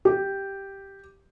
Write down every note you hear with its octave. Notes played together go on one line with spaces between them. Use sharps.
G4